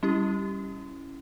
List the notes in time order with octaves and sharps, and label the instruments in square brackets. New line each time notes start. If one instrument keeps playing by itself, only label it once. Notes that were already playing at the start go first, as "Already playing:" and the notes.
[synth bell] G3 C#4 E4 G4